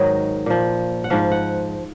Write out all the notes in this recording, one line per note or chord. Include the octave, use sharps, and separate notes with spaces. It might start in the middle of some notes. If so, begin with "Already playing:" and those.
Already playing: G#2 D#3 F#3 D#5
A#2 F3
F#5
G#2 F3 F5
F#5